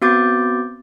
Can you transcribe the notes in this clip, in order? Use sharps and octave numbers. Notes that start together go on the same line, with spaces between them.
B3 C4 F#4 D6 G6 A6